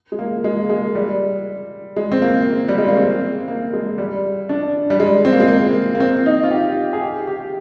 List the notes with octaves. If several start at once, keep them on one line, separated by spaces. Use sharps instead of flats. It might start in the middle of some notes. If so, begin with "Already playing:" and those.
G#3
A#3
G#3
A#3
G#3
G3
G#3
C4
A#3
G3
G#3
A#3
C4
A#3
G#3
G3
D4
G3
G#3
C4
A#3
G#3
A#3
A#3
C4
D#4
F4
G4
G#4
G4
G4